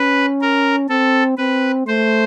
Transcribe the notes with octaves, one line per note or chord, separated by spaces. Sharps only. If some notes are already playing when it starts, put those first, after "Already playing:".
Already playing: C#4 B4
A#4
C4 A4
C4 B4
A3 C5